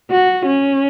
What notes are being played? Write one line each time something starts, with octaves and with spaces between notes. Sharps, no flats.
F#4
C#4